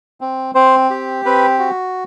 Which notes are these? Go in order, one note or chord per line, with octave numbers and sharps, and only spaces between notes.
C4
C4 C5
G4
C4 B4
F#4